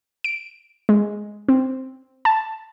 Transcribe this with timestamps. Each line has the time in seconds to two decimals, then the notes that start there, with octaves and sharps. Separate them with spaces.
0.24 D7
0.89 G#3
1.49 C4
2.25 A5